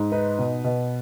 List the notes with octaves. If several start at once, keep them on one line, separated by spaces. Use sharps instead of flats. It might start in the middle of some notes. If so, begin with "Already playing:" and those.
Already playing: G#2
D#4 B4
B2
B2